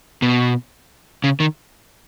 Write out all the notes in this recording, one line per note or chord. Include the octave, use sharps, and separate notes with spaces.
B2
C#3
D#3